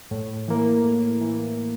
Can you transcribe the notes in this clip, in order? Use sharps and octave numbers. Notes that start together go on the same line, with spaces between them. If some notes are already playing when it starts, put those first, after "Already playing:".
A2
E3 A#3
A2
E3 A#3